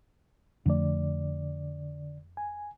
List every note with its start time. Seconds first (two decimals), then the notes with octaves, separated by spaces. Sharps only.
0.66 F2 D3 F3 A3 D5
2.37 G#5